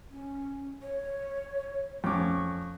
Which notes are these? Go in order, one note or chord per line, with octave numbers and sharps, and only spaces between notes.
C#4
C#5
F2 C#4 C#6 D6